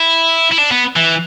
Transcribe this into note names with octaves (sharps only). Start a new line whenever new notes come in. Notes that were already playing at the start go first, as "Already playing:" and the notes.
Already playing: E4
E4
D4
B3
E3